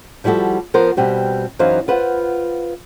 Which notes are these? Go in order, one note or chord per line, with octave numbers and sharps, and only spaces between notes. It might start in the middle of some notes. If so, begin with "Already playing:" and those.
F3 G3 E4 F#4 A4
F3 B3 A#4 C5
B2 G3 C4 G4
F#2 E3 D#4 C5 F5
F4 B4 C5 F#5